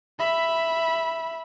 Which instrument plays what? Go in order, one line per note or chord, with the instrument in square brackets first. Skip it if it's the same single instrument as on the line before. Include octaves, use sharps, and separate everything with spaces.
[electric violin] E5 B5